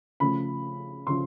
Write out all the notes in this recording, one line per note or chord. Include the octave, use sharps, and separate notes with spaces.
C#3 F3 A3 B5
C#3 F3 C6